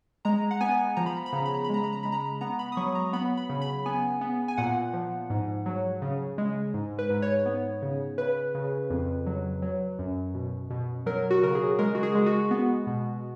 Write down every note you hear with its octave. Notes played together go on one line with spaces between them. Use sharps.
G#3 A#5
F#5
B3 G#5
F3 A#5
B5
A#5
B5
C#3 A#5
B5
A#5
B5
G#3 A#5
B5
A#5
G#3 B5
A#5
B3 A#5
B5
D#6
F#3 C#6
A#5
B3 B5
B5
C#3
B5
B3 G#5
B3
G#5
A#2 F#5
F3
G#2
F#3
C#3
G#3
G#2
B4
G#2
C#5
B3
C#3
C#3 B4
C#3
F2
F#3
F#3
F#2
B2
B2
F#3 A#4
F#4
C#3 A#4
G#4
G#3 A#4
F#4
G#4
G#3
F#4
B3
B2